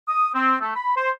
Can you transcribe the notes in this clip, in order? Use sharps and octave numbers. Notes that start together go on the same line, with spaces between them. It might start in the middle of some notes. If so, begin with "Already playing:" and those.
D#6
C4
A3
B5
C5